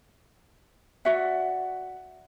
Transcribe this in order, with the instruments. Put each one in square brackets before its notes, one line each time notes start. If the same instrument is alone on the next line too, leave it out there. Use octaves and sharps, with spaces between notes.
[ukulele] F#4 D5 E5 F#5